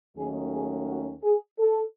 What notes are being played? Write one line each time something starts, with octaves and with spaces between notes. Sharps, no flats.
D#2 D#3 F#3 A3 C#4 G#4
G#4
F#4
G#4
A4